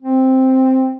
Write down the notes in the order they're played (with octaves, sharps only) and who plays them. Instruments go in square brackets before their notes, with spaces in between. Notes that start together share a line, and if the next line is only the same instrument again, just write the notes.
[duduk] C4